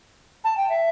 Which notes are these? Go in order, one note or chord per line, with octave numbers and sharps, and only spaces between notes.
A5
G5
E5